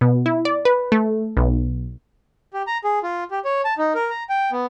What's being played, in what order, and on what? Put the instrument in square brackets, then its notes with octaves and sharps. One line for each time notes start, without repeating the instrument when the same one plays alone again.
[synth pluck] B2
E4
D5
B4
A3
B1
[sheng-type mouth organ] G4
A#5
G#4
F4
G4
C#5
A5
D#4
A#4
A#5
G5
B3